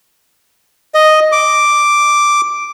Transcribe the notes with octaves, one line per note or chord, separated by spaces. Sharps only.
D#5
D6